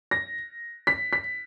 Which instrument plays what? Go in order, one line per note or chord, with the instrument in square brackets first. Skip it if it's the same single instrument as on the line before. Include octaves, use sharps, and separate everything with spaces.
[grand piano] A#6
B6
B6